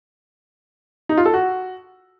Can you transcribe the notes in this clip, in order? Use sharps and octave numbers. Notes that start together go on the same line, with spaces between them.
D#4
F4
A4
F#4